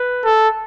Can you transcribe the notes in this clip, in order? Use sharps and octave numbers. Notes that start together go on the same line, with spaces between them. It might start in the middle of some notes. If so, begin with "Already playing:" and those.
Already playing: B4
A4